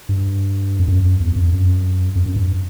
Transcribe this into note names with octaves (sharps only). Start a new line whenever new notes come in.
G2
F2
F#2
E2
F#2
F2
F#2
F2
F#2
G2